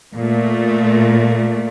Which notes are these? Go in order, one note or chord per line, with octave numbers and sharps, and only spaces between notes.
A#2 A3